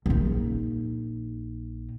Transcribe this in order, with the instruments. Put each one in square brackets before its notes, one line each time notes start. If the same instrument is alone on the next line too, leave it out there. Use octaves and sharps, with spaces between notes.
[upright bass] A#1 D#4